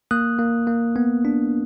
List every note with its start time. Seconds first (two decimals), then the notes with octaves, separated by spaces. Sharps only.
0.11 A#3 D#6 F#6
0.39 A#3
0.67 A#3
0.96 B3
1.25 D4